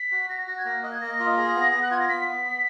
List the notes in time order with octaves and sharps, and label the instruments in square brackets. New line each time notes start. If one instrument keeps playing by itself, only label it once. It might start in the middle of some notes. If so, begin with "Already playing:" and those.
Already playing: [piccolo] B6
[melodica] F#4
[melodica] F#4 [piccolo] A#6
[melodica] F#4
[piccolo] G#6
[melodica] A#3 [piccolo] A#6
[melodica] D#5 [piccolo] F#6
[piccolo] G#6
[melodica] A#3 [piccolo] A#6
[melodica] F4
[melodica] G#4 [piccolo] A#6
[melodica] B3
[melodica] B3 [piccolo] A#6
[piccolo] F#6
[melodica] F4 [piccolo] G#6
[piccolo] A#6
[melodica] B3 [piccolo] B6
[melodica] B3
B3